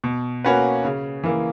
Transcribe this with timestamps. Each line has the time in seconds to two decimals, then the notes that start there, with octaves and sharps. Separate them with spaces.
0.04 B2
0.44 A#3 C#4 F#4 B4
0.85 C#3
1.24 E3 A#3